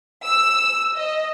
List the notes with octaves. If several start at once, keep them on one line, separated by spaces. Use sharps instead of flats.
E6
D#5